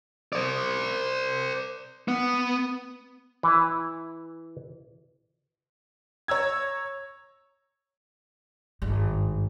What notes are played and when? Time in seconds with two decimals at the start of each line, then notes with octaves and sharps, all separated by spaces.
0.33 C5 D5
2.08 B3
3.43 E3 E4
6.28 C#5 A#5 E6 G#6
8.82 G#1 G2